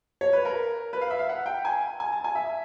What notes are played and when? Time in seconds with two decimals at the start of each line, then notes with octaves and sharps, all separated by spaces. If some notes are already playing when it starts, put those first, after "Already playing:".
0.21 C#5
0.33 B4
0.45 A#4
0.93 B4
1.01 F5
1.10 E5
1.19 F5
1.29 F#5
1.46 G5
1.65 G#5
2.00 G#5
2.12 A5
2.24 G#5
2.35 E5